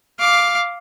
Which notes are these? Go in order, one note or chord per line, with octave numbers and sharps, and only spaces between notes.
F5 D6